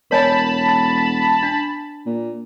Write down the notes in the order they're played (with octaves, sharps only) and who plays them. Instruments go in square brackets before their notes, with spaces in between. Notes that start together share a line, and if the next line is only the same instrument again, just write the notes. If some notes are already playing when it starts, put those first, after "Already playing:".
[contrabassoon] E1 [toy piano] A#4 C#5 G#5 [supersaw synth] A5 B5
[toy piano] D4
[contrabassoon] A#2